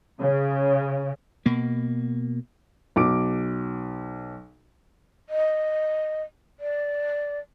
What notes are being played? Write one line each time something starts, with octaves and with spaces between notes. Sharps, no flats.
C#3
B2 A#3
B1 D6 D7
D#5
D5